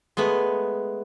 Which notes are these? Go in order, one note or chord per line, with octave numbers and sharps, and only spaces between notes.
G#3 A3 B3 B4